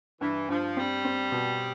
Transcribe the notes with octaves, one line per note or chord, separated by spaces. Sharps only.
G2 E3
G2 F3
G3 C4
C4
B2